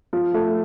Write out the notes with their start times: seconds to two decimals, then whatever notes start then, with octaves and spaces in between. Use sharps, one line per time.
0.13 F3
0.34 A3